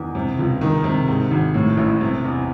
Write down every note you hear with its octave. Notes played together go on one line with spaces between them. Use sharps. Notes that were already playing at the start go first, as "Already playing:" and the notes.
Already playing: E2 D#3
C3
C#2
D#3
C3
G#2
G#1
A2
A1
C3
E2